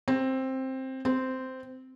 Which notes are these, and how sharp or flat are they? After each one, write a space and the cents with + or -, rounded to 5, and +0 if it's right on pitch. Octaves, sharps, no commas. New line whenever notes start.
C4 +10
C4 -10